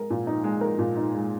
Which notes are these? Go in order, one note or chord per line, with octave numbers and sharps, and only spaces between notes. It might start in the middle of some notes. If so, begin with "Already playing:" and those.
Already playing: G#3 A#4
A#2
D#4
G#3
A#4
A#2
D#4
G#3